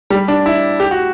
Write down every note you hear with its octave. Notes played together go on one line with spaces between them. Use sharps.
G3
D4
E4
G4
F#4